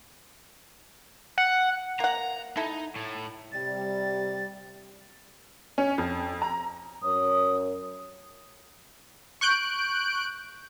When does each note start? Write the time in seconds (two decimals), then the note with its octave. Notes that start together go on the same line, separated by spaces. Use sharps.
1.38 F#5
2.00 A#3 F#5 A#5
2.57 D#4 E4 A4
2.96 A2
3.52 C3 G3 A6
5.78 C#4
5.98 F2
6.42 A#5
7.02 F#2 A#4 C#5 D#6
9.41 C#6 F#6 G6 D7